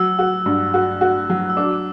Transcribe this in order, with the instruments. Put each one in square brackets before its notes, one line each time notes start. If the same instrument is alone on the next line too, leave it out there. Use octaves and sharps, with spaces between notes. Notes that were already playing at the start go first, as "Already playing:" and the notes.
Already playing: [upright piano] F#3 [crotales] E6
[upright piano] F#4
G2
F#4
F#4
F#3
[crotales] E6
[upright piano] D4 [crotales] D6